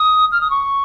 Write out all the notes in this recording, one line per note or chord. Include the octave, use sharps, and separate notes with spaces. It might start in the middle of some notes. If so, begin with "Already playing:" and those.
Already playing: D#6
F6
D#6
C#6